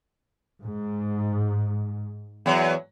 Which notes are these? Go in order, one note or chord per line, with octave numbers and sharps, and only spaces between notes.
G#2
E2 F#3